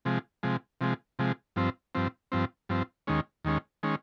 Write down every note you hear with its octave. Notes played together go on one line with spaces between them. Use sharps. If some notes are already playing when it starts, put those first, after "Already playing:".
C3 F3 G#3
C3 F3 G#3
C3 F3 G#3
C3 F3 G#3
G2 F3 C4
G2 F3 C4
G2 F3 C4
G2 F3 C4
D#2 D#3 G#3 C#4
D#2 D#3 G#3 C#4
D#3 G#3 C#4